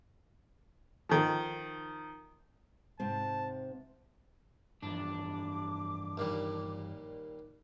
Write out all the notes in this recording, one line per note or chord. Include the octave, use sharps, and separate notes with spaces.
D#3 F3
G#2 C3 C4 A5
G2 E3 F3 D4 D6
D#2 A#2 G3